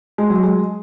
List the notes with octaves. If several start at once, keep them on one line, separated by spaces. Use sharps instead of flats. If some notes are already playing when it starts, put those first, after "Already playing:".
G#3
F#3
G#3